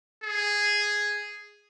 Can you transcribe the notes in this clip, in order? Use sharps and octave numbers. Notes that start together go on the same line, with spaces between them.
G#4